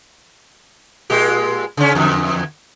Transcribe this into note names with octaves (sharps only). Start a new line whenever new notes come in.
A#2 G#3 G4
C#3 C#4
E2 D3